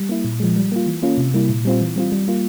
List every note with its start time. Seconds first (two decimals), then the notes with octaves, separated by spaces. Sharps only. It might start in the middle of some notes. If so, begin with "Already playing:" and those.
Already playing: G3
0.09 A#3 E4
0.25 A#2
0.40 F3 G#3
0.56 G3
0.72 A#3 F4
0.87 E3
1.03 A#3 C#4 F4
1.18 C3
1.34 G3 A#3 E4
1.49 A#2
1.65 G3 C4 F4
1.81 E3
1.96 G3 C4 F4
2.12 G3
2.28 A#3 F4